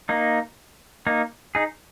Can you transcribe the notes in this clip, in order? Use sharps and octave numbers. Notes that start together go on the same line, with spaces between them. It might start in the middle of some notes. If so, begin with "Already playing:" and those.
A#3 D#4
A#3 D#4
D#4 G#4